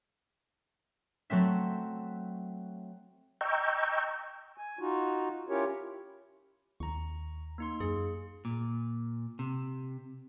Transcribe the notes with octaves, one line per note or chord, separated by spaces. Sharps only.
F#3 A3 C4 E5
D#5 G5 A#5 C#6 E6 G6
G#5
D#4 F4 F#4
C#4 E4 F4 G4 A#4 C#5
D#2 A#5 C#6
A#3 D#4 C6
F#2 G#4
A#2
C3